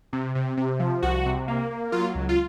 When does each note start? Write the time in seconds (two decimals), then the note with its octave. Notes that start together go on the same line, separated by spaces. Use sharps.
0.13 C3
0.35 C3
0.57 C3
0.79 F3
1.02 C2 F#4
1.26 C3
1.48 A#3
1.71 A#3
1.92 F#3 F4
2.15 C#2
2.29 F4